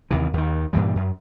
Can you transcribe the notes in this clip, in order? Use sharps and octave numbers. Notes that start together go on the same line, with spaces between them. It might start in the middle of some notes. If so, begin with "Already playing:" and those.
D#2 C3 E3
D#2 D#3
G2 A#2 E3 G3
F#2